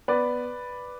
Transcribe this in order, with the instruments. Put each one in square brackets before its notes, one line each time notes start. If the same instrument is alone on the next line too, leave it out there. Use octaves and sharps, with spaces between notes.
[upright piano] B3 B4 D5